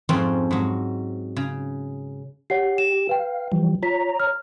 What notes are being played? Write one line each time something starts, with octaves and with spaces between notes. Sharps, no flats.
F2 G#2 F3 C4 C#4
G#2 F#3
C#3
G4 C#5 F#5 C7
E7
B4 F5 G5
E3 F3 G3
F4 C#5 A#5 B6
F6